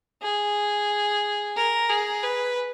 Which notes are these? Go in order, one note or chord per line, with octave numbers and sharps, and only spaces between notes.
G#4
A#4
G#4
B4